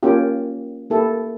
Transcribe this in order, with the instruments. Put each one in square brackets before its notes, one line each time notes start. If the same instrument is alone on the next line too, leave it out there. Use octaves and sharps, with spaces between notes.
[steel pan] A#3 C#4 F4 G4
A#3 E4 G4 A4